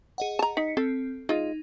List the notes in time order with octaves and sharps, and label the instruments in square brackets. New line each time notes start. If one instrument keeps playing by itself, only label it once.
[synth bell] G#4 D#5 F#5
[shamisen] A5 A#5
[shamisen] D#4 [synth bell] B6 C#7
[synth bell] C4 [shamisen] A4
[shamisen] G#3 F4 [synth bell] D#4